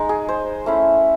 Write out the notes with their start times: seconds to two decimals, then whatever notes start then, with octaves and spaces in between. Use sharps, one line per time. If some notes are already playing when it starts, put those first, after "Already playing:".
Already playing: G#3 D#4
0.09 G#4
0.29 C5
0.66 A3 C#4 E4